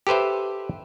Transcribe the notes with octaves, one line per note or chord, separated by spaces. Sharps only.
G4 A4 B4 C5 E5